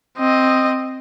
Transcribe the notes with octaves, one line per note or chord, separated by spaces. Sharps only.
C4 D#5